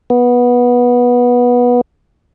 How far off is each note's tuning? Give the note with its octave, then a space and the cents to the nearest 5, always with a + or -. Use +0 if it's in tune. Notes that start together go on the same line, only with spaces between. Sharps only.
B3 -15